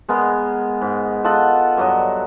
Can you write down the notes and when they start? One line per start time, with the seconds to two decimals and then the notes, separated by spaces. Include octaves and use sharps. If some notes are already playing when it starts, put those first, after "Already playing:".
0.08 G#3 B3 A#4
0.81 G#2
1.24 F4 A4 D#5 F#5
1.77 G2 F#3 D#5